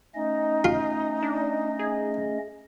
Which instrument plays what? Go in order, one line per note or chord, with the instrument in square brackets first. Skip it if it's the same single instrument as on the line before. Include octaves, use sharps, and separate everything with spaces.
[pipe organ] A3 C#4 D#5 [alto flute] D#4
[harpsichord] F4
[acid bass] D4
G#4